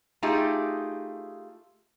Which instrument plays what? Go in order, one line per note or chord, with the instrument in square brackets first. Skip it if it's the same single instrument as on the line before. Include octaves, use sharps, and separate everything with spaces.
[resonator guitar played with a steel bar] A3 D#4 F4 G4 G#4